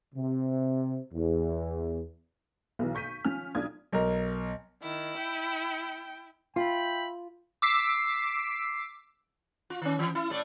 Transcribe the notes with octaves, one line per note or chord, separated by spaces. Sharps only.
C3
E2
B1 B2 E3
C#6 G6 B6 D#7
F3 C#4 F6
B1 D4 F4 D#6 G#6
B1 A#4
D#3 E4
G5
F4 E5 G5 B5
D6 E6 B6 C7
F4
D#3 C#4
E3
E4
A2 A3 D5